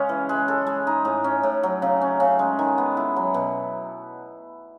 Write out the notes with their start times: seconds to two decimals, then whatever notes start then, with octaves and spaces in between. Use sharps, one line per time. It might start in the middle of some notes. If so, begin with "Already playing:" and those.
Already playing: C#3 G#3 C#4
0.09 E3
0.29 G#3
0.48 A4
0.67 G#3
0.87 D#4
1.05 A2
1.24 C#4
1.43 A2
1.63 F#3
1.82 C#3
2.01 C#4
2.20 C#3
2.39 G#3
2.59 D#3
2.78 B3
2.97 E4
3.16 F#3
3.34 B2